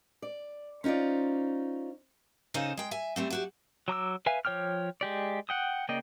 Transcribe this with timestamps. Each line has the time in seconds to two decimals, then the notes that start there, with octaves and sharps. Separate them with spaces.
0.22 D5
0.84 C#4 D#4 F4 C5 D5
2.54 C#3 D#4 A4 C5 D#5
2.77 G#3 G5
2.91 E5 G#5
3.16 G3 A3 C4
3.30 F#3 F#4 G4
3.88 F#3 A#5 D6 E6
4.26 B4 E5 F5 G#5
4.45 F3 C#5 G5 D6 F6
5.01 G#3 G4 D5
5.49 F#5 G5 D#6
5.89 C#3 A#3 D5 D#5 G5